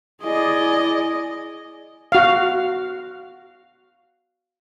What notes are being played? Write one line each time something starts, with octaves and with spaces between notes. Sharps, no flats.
E4 G#4 D5 D#5
F#4 F5